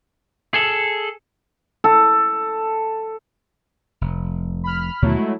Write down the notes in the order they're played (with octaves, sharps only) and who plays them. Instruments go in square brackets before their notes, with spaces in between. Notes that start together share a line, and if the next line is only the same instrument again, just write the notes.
[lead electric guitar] G#4 A4
[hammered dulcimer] A4
[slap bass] F1
[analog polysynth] B5 F6
[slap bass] D#2 B2 D3 [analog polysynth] F#3 A3 E4
[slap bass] G#3